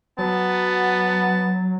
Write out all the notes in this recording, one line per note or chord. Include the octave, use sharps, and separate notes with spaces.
F#3 B3 A5